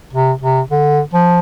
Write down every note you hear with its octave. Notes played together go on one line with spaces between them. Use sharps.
C3
C3
D3
F3